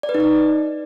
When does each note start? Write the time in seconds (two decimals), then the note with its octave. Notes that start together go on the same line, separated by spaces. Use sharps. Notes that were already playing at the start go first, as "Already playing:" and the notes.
0.03 D5
0.09 B4
0.15 D#4
0.20 D5